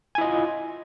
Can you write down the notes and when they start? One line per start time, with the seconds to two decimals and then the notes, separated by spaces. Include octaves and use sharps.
0.15 G#5
0.18 E4
0.21 D#5
0.24 F4